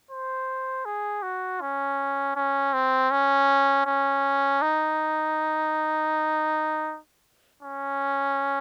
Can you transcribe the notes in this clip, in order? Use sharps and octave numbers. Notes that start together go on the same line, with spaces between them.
C5
G#4
F#4
C#4
C#4
C4
C#4
C#4
D#4
C#4